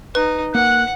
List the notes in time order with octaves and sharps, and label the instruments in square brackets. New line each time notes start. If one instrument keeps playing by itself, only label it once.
[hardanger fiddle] D#4 [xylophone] B4
[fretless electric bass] A#3 [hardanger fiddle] F#5 [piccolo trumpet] F#6